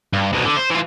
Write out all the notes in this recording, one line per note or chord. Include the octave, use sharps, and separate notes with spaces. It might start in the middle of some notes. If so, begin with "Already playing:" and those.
G2
C2 B2
D3
C5
E3 F4